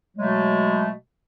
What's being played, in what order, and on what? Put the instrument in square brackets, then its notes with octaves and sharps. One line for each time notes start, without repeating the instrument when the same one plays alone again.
[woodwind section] B2 F#3 G#3 A3